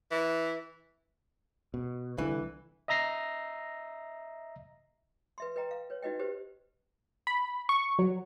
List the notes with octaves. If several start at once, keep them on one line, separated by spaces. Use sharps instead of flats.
E3
B2
C2 D3 E3
D#5 E5 A#5 A#6 C7
B4 E5 C6
B4 D#5 G5 A#5
F5
B4 C#5
D#4 F#4 B4 D#5 G5
G4 B4 C5
B5
C#6
F#3